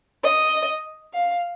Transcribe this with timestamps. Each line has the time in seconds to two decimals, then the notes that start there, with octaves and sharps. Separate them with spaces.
0.24 D#5
1.14 F5